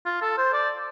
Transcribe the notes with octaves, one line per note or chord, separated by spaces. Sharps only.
F4
A4
C5
D5